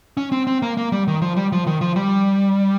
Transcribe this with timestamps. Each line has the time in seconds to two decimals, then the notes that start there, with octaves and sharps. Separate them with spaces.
0.17 C#4
0.32 C4
0.47 C4
0.62 A#3
0.77 A#3
0.92 G3
1.08 D#3
1.22 F3
1.36 G3
1.52 F3
1.67 D#3
1.81 F3
1.96 G3